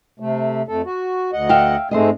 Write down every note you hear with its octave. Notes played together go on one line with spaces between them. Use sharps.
C3 A3
F2 A3 A4
F#4
D2 D#5 F#5
E5 F5 G5
G#2 G#3 A3 C4 G#4 D#5